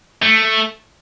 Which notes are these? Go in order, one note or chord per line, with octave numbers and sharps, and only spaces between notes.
A3